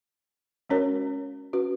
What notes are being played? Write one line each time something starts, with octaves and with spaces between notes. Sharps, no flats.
G#3 C#4 F#4 A#4 C#5
C#4 F#4 B4